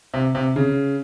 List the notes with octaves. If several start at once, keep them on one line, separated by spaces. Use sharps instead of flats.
C3
C3
C#3